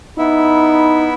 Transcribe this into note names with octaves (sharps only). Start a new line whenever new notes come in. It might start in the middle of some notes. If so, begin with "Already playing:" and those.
B3 D#4 E4 E5